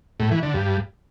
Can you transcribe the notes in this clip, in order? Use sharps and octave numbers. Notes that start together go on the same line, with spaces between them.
A2
E3
D3
G2